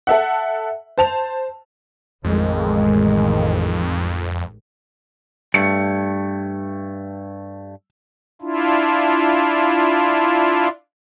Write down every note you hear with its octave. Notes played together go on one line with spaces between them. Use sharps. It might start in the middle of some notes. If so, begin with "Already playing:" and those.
A4 E5 F#5
C5 A5 F7
A1 F2 D#3 G#3
G2 A3 C#7
D4 E4 F4